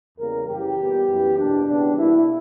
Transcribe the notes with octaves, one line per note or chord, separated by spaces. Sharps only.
E2 C#3 G3 A#3 A#4
F#2 C#3 E3 G4
A#2 G3 B3
F#2 E3 B3
E2 B2 A#3 D4
C#3 E3 G3 B3 D4
B2 A#3 E4